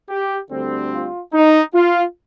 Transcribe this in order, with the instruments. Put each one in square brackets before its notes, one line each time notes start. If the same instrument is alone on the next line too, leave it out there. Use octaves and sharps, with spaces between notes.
[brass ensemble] G4
D2 D3 G3 C4
F4
D#4
F4